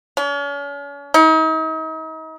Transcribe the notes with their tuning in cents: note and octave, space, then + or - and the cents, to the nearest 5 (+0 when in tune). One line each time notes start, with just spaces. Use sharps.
C#4 +40
D#4 +40